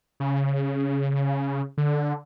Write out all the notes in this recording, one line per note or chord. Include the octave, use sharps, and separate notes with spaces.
C#3
D3